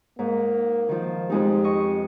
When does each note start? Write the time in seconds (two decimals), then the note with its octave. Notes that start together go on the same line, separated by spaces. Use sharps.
0.19 G#2 A#3
0.89 D#3 F3
1.30 F2 G#3 D#4 G4
1.64 D#5 C#6